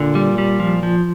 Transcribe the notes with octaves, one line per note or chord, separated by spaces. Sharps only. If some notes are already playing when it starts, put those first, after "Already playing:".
Already playing: A#2 D3
G3
G3
F3
F3